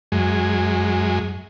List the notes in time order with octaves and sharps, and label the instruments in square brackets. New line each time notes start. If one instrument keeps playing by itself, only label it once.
[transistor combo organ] F#2 G#3